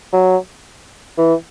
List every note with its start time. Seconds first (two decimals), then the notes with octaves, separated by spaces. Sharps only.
0.13 F#3
1.18 E3